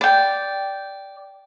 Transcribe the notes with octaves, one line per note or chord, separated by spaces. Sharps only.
D5 G5